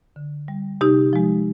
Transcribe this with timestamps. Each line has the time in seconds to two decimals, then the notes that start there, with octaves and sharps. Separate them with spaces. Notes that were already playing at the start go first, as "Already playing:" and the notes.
0.16 D3
0.48 G3
0.81 C3 D#4 G4
1.13 F3 G#3